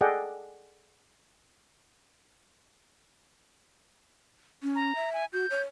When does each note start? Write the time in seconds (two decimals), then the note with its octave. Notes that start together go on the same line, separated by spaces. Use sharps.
0.01 G#4 A4 D5 D#5 F#5 G5
4.63 C#4
4.75 A#5
4.96 E5
5.13 G#5
5.33 F#4 G6
5.50 C#5